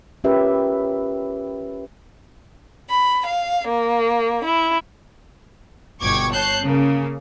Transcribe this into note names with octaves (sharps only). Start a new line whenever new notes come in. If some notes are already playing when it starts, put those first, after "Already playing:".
C#4 F4 G4 A#4 B4 E5
B5
F5
A#3
E4
G1 B2 G5 C#6 D6 G#6
C#5 A5 F#6 G6 C7
C#3 A#3